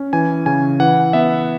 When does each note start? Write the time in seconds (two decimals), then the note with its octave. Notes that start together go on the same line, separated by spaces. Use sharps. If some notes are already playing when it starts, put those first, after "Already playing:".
Already playing: C#4
0.13 E3 G#5
0.46 C#3 G#5
0.80 E3 F#5
1.13 B3 E5